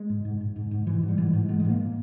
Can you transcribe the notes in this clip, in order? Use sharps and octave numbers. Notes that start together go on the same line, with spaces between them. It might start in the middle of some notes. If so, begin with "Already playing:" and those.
Already playing: G#3
G#2
G#2
G#2
G#2
G#2
G#2 E3
G#2
G3
G#2 E3
G#2
G#2 G#3
G#3
G#2 A#3